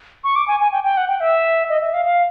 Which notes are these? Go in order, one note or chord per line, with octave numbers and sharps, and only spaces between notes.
C#6
D6
G#5
G#5
G5
G5
F#5
G5
E5
D#5
E5
F5
F5